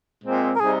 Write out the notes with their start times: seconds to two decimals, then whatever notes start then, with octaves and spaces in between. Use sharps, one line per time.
0.22 A#2 G#3 C4
0.56 A#4
0.60 C3 G3 C4 D#4 G#4